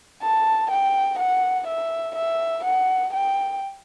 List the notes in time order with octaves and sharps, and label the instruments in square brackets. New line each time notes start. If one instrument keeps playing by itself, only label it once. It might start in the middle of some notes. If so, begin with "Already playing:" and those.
[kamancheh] A5
G5
F#5
E5
E5
F#5
G5